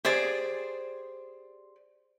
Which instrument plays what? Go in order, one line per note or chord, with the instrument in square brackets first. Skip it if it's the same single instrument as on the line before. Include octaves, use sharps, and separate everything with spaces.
[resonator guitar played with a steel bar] G4 G#4 C5 D5